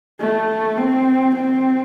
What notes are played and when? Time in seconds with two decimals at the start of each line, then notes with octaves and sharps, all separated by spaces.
0.20 A3
0.77 C4
1.36 C4